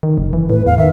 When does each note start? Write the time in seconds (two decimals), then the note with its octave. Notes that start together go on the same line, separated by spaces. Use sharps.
0.03 D#3
0.18 F#1
0.33 E3
0.50 A2 B4
0.66 E2 F5
0.78 D#3 E5